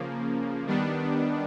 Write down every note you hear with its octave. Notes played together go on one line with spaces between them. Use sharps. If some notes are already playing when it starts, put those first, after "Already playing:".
Already playing: C#3 F3 A#3
D#3 G3 B3 D4